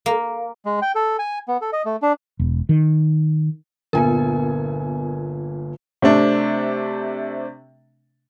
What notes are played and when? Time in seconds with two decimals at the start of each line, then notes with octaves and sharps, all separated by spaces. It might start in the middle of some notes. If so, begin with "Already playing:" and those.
0.06 A#3
0.65 G#3
0.82 G5
0.95 A4
1.19 G#5
1.48 B3
1.61 A4
1.73 D#5
1.85 A3
2.02 D4
2.39 E1
2.69 D#3
3.93 G1 A#2 B3 A#4 G#5
6.02 C3 A3 C4 D4